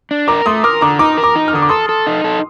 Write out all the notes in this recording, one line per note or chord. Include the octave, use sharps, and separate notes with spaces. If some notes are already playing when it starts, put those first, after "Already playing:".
D4
A#4 A#5 D6
A3 C6 D#6
A#4 D6 F6
D3 A#5 D6
D#4 A#5 D6
A#4
A#5 D6
D#4
F6
D3 D#6
D6
A4 C6 D#6
A4
D#4
A4